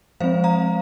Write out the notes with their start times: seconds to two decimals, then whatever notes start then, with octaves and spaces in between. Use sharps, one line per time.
0.20 F3 G#3 C4 C5 F5
0.44 F5 A#5